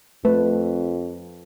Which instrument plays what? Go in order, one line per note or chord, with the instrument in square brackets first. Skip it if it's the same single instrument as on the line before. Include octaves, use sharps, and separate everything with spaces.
[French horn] F2 [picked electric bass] A3 [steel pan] B4